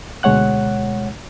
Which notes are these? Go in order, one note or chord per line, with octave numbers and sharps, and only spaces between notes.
D2 B2 G#3 C#5 F#5 F#6